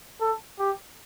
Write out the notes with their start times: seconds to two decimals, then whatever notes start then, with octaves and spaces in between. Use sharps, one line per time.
0.21 A4
0.59 G4